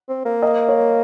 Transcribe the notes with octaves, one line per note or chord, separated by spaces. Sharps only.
C4
A#3
D#5
C#5